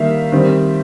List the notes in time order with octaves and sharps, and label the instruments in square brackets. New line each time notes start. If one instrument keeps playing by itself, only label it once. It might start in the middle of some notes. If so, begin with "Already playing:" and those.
Already playing: [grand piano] D#3 G3 A#3 E5 F5
D#3 G3 C4